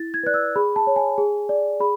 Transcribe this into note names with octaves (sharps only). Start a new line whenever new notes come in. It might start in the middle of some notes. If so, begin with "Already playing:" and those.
Already playing: E4 A6
G#6
B4 D5 F#6
E6
G#4 B5
A5
C#5
G#5
G#4
D5
G#4 B5